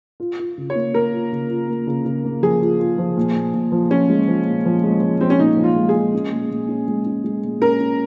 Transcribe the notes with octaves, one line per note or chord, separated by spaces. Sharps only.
F4
F4
C#3
C#5
A#3
A#3 A#4
F4
C#3
F4
A#3
C#3
C#3
A#3
F3 G#4
F4
F4
F3
A#2
A#2
A#2
F3
F3 C#4
G#3
F3
A#2
F3
G#3
F3
F3 C4
C#4
A#2 D#4
F3
F4
G#3
G#4
G#3
C#4
A#2
A#2
C#4
G#3
C#4
G#3
A#2
C#4 A#4
C#4